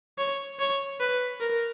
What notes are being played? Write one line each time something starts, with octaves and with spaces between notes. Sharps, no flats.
C#5
C#5
B4
A#4